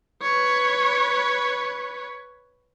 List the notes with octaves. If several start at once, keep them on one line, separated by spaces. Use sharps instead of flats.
B4 C#5